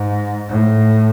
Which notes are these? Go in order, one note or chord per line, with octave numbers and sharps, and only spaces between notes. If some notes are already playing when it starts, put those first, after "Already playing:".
Already playing: G#2
A2